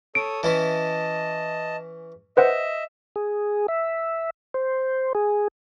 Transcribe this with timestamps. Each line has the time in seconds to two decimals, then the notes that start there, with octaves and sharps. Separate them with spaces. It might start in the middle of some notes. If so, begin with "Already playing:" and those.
0.15 A4 C#5 D#6 D7
0.43 E3 C#4 E4 D#5 A5
2.37 B4 C5 D#5 E5 F#5
3.16 G#4
3.68 E5
4.54 C5
5.15 G#4